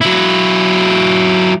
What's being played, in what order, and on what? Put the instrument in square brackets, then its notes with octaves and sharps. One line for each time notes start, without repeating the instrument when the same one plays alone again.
[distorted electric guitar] F#3 E4